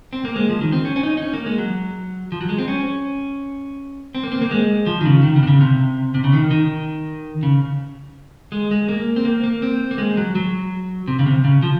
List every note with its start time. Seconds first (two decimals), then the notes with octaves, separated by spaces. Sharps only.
0.13 C4
0.25 A#3
0.36 G#3
0.49 F3
0.61 D#3
0.72 C4
0.85 C#4
0.96 C#4
1.03 D#4
1.17 D#4
1.22 C#4
1.33 A#3
1.46 G#3
1.58 F#3
2.32 F3
2.41 F#3
2.49 G#3
2.58 C4
2.68 C#4
4.15 C4
4.23 A#3
4.32 C4
4.42 A#3
4.51 G#3
4.86 F3
5.01 D#3
5.06 C#3
5.23 D#3
5.36 C#3
5.43 C3
5.47 C#3
5.61 C3
6.14 C3
6.24 C#3
6.33 D#3
6.51 D#3
7.43 C#3
8.52 G#3
8.71 G#3
8.89 A#3
9.16 C4
9.25 A#3
9.44 A#3
9.62 C4
9.91 A#3
9.98 G#3
10.17 F#3
10.35 F#3
11.08 C3
11.19 C#3
11.27 C3
11.45 C#3
11.62 F3